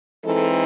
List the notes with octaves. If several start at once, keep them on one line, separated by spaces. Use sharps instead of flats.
E3 G#3 C4 D#4 A4